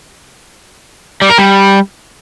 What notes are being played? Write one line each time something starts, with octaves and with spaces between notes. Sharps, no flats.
G3
A#4
G3